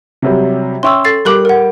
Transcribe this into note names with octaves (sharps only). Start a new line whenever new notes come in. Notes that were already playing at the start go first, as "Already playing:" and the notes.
C3 F#3 G3
C#4 E5 G5 C6 C#6 E6
A4 A6 C7
G3 A#4 D6 F#6 F#7
A#4 F#5